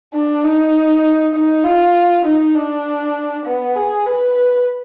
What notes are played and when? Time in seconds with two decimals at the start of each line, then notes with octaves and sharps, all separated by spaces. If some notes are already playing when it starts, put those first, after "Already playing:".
0.14 D4
0.44 D#4
1.34 D#4
1.64 F4
2.25 D#4
2.55 D4
3.46 B3
3.76 G#4
4.06 B4